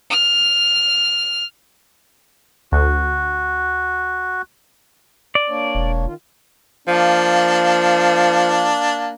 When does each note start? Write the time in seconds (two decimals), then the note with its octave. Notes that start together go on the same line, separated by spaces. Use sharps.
0.10 F6
2.72 D2 F#4
5.35 D5
5.49 A#3 D4 C#5
5.75 E1
6.06 D#3 F4
6.88 F3 A#3 D4